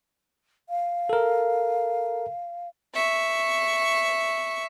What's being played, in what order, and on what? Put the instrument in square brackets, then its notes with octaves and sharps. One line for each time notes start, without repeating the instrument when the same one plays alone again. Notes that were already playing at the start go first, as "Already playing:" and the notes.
[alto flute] F5
[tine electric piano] A4 A#4
[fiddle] E5 C#6